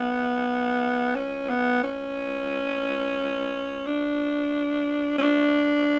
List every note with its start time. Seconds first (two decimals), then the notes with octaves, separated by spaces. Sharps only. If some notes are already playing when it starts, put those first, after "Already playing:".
Already playing: B3
1.15 C#4
1.50 B3
1.83 C#4
3.86 D4
5.18 C#4
5.22 D4